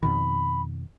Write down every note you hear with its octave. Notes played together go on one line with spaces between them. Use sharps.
F2 B2 D#3 B5